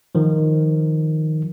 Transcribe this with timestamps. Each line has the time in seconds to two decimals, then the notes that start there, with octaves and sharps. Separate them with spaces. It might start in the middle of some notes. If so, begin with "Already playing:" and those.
0.15 D#3 F3